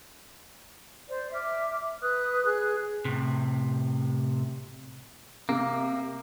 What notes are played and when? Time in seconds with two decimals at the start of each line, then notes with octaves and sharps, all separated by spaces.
1.09 C5 D5
1.33 E5 D6 F6
2.02 B4 D#6 F#6
2.45 G#4 F#6
3.05 A2 C3
5.49 C3 A#3